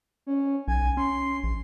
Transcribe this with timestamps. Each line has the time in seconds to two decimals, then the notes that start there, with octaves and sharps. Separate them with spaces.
0.27 C#4
0.68 B1 G#5
0.97 C#4 C6
1.44 A#1